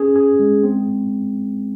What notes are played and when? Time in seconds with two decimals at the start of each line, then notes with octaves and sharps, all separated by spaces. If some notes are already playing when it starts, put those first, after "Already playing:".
Already playing: C#4 G#4
0.16 G#4
0.39 G#3
0.63 C4